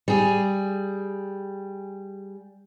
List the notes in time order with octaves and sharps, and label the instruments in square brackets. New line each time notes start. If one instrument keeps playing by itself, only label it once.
[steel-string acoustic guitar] G3 G#4